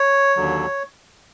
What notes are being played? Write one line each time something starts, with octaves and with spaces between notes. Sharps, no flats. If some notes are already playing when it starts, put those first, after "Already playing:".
Already playing: C#5
D#2 D3 F#3